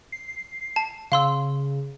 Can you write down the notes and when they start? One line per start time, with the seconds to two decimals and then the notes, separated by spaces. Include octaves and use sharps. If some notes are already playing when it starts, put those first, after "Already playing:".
0.12 C7
0.76 A5
1.12 C#3 F5 C6 E6